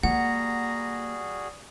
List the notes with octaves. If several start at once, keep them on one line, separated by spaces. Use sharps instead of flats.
G3 A#3 F#4 G#4 F#5 A#5